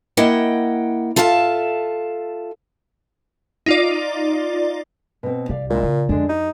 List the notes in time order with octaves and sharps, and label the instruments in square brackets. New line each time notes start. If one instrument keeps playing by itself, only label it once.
[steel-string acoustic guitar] A#3 E4 D#5 F#5 G5
F4 A4 E5 F5 A5
[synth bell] D#4 F4 D5
[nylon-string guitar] B2 C4
[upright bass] C2 [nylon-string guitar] G4 D5 F5
[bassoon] A#2 [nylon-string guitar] G#3 E4
[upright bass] C#3 [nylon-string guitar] F4
[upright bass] F2 [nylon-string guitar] D3 G#3 D4
[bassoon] D#4 [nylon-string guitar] G4